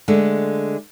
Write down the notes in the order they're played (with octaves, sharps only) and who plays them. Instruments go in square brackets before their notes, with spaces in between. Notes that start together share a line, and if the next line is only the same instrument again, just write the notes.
[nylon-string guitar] D3 G#3 A3